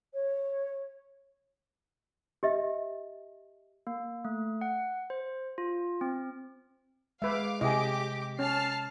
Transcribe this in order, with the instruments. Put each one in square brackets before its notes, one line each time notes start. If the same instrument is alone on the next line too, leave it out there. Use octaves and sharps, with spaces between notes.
[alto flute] C#5
[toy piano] G4 D#5 E5
[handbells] A#3
A3
F#5
C5
F4
C4
[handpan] G#3 [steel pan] B4 E5 [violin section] F5 D6
[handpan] C3 D#5 [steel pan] E4 G#4 [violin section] G4 D6
[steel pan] C#4 [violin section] A5 F6 C7